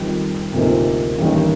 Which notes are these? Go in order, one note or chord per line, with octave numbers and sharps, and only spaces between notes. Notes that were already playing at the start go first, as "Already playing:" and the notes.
Already playing: F2 D#3 G3
D2 C3 F3 A#3 D#4
A1 G2 D#3 A#3